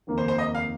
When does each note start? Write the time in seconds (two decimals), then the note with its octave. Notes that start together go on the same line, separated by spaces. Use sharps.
0.07 F1 D#2 D#3 A#3
0.18 C5
0.28 C5
0.38 D#5
0.55 F5